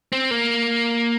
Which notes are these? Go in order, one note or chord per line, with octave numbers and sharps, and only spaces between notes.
C4
A#3